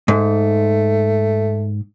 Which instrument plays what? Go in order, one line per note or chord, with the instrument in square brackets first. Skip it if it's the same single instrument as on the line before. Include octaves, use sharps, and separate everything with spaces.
[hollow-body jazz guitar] G#2 [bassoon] A3